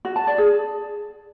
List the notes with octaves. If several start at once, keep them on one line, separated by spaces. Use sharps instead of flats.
F#4
A5
D5
G#4